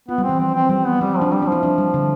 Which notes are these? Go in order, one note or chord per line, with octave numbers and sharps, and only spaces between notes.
B3 F4
G3
C4
E3
F3 C4
C4
G3 C4
B3
G3 C4
F3 D4
G3 D4
D4
F3
E4
D4
G3
D3